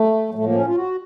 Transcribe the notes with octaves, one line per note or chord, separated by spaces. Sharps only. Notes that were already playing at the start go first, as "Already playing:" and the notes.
Already playing: A3
F#3
A2 F3 A3
A#3
C#4
F4
F#4